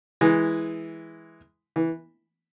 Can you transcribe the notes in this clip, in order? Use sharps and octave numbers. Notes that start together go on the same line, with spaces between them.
E3 G#3
E3